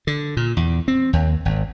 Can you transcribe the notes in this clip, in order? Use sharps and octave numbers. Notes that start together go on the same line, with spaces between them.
D3
A#2
E2
C4
D#2
G#1